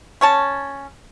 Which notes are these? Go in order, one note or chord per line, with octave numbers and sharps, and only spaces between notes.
C#4 C#5 A5